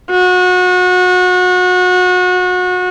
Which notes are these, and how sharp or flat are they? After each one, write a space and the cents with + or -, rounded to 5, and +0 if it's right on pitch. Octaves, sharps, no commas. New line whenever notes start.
F#4 -30